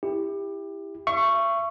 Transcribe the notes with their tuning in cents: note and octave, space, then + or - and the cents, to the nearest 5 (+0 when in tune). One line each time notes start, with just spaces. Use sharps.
E4 +0 G4 +20
E5 +40 C#6 +0